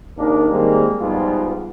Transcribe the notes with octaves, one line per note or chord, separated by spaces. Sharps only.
G#1 D#2 D#3 D4 A#4
D#3 G3 G#3 A#3 C4 A#4
G#2 F3 G3 B3 F4